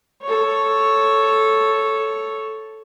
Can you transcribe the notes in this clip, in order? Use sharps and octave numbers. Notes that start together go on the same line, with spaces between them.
A4 C#5